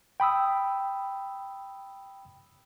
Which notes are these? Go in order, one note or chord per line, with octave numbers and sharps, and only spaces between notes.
G5 B5 D#6 E6